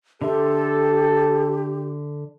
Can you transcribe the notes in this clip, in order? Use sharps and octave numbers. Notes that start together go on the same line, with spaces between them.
D3 G4 A4 E5 C6